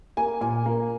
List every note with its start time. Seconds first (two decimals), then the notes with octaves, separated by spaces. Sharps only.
0.17 A#3 G#5
0.41 A#2 G#5
0.66 A#3